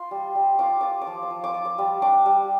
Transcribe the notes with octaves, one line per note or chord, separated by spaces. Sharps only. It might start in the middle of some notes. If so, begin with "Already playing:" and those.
Already playing: F4 C6
G3
G3
F4 D6
F4 D6
D6
F3
D6
F3
D6
F4
D6
G3
D4 D6
G3